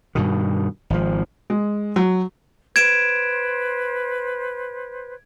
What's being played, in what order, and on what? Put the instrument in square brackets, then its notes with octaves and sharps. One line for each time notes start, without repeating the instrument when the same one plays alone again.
[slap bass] G2 B2 D#3
G#1 F3
[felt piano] G#3
F#3
[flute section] B4 C5 [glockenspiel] G#6 D7 E7